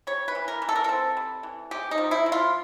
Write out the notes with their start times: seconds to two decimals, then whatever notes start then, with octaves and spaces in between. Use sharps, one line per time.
0.07 G3 C#5
0.28 B4
0.35 E3
0.48 A#4
0.62 E3
0.69 A4
0.76 A#4
0.84 C4 A4
1.17 G3
1.43 E3
1.71 G#3 G4
1.91 D#4
1.98 F3
2.11 E4
2.26 F3
2.32 F4